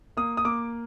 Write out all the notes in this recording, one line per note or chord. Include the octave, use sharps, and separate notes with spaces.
A#3 D#6
D#6
A#3 D6